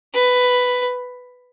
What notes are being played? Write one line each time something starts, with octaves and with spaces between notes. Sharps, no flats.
B4